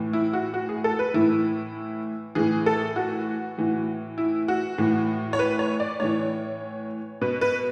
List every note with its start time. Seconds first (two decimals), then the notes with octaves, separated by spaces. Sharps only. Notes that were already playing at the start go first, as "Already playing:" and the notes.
Already playing: A2 E3
0.13 E4
0.33 F#4
0.54 F#4
0.69 G#4
0.84 A4
0.99 B4
1.14 A2 E3 E4
2.35 A2 E3 G#4
2.66 A4
2.96 F#4
3.58 A2 E3
4.18 E4
4.48 F#4
4.78 A2 E3
5.33 C#5
5.39 B4
5.59 C#5
5.80 D5
6.00 A2 E3 C#5
7.21 B2 B4
7.41 B4